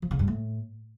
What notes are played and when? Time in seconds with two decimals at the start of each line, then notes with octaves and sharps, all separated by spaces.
0.02 F3
0.11 C#3
0.19 G2
0.28 A2